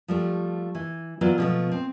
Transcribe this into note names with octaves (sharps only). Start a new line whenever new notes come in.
F3 G3 A3
E3
E3 F#3 B3 F4 D5
B2 F3 A3
C4